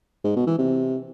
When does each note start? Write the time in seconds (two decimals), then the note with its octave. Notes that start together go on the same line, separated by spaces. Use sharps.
0.25 G#2
0.36 B2
0.47 E3
0.58 C3